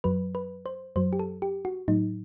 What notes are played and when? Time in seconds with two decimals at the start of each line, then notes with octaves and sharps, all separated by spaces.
0.04 F#2 F#3 B4
0.35 B4
0.66 C5
0.96 F#2 F#3 C5
1.13 G4
1.19 A4
1.42 G4
1.65 F#4
1.88 A2 F#3 D#4